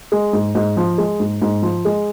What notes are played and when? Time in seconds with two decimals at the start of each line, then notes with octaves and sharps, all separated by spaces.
0.12 G#3
0.33 G#2
0.55 G#2
0.77 F3
0.98 G#3
1.20 G#2
1.42 G#2
1.62 F3
1.85 G#3